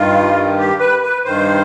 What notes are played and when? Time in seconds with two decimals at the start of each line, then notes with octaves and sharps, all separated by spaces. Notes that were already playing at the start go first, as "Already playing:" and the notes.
Already playing: G2 D#3 F4
0.58 G4
0.79 B4
1.03 B4
1.25 G2 D#3 C5